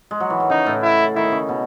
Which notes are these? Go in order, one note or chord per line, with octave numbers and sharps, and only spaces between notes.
G#3
F#3
E3
D#3
C#3 D#4
A2
E4
D#3 E4
C#3
B2